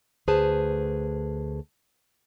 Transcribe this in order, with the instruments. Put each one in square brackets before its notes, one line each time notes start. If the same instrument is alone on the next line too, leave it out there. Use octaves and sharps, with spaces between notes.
[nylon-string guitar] D2 G#4 B4 C5 A5